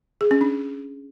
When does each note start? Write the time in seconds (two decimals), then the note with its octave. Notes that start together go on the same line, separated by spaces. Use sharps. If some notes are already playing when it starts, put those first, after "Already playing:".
0.21 G#4
0.31 C#4
0.41 D4